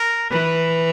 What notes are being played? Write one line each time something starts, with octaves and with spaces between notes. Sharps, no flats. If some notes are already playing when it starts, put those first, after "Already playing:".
Already playing: A#4
E3 B4